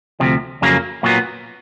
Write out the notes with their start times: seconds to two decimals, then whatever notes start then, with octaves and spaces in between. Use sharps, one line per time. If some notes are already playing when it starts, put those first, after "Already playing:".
0.20 D2 C3 F3
0.62 F2 C#3 F#3 A#3
1.03 A#2 F#3 B3